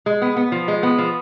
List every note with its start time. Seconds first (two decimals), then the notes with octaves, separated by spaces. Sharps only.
0.06 G#3
0.22 B3
0.36 B3
0.52 F3
0.68 G#3
0.83 B3
0.98 F3